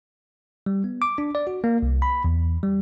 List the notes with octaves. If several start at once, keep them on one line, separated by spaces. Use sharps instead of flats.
G3
B3
D6
D4
D5
F#4
A#3
C2
B5
E2
G3